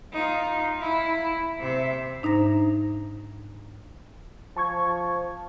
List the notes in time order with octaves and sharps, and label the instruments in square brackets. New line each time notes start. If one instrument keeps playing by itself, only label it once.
[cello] D#4 F4
E4
C3 E5
[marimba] G#2 D4 D#4 C5 A#5 A#6
[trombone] F3 [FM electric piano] A5 C#6 G#6